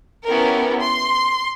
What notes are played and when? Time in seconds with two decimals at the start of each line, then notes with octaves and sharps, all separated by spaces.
0.25 B3 C#4 E4 G4 A#4
0.80 C6